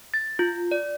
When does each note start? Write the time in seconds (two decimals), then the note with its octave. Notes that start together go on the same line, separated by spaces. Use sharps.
0.14 A6
0.39 F4
0.71 D5